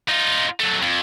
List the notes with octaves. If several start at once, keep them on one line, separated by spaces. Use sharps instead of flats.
D#4 F4
F#3 A3
F2